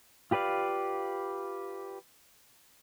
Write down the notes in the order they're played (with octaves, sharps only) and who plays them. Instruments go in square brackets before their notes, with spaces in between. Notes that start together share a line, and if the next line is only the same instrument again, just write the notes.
[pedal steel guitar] F4 G4 B4 D5 F5